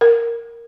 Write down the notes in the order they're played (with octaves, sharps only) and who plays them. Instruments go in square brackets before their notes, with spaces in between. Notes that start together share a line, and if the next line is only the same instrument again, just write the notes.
[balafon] A#4